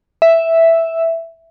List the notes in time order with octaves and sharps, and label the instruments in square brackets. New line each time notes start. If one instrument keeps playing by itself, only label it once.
[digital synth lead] E5